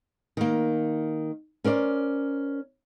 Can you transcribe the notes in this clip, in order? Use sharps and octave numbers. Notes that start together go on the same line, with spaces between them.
D#3 A#3
C#4 A#4 C5 D5